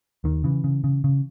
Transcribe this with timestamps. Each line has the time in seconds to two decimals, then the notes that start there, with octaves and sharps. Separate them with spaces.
0.24 D#2 D#3
0.44 C#3 E3
0.64 C#3
0.84 C#3
1.04 C#3